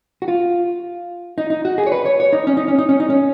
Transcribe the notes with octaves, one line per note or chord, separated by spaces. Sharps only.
F#4
F4
D#4
D#4
F#4
G#4
C#5
B4
C#5
C#5
D#4
C#4
D#4
C#4
D#4
C#4
D#4
C#4